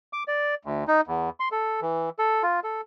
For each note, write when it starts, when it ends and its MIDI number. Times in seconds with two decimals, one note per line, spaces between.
0.13 0.23 86
0.28 0.55 74
0.65 0.84 38
0.88 1.01 63
1.07 1.29 40
1.40 1.48 84
1.52 1.80 69
1.81 2.09 52
2.19 2.43 69
2.43 2.60 65
2.64 2.81 69